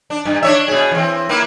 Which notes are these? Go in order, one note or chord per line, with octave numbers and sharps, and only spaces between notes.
D4
G2
D4 C#5 E5
B2 G#4
E3 C4
A#3 E4 B4